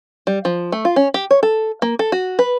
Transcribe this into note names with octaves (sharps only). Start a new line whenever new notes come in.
G3
F3
A3
F4
C#4
G4
C#5
A4
A#3
A4
F#4
B4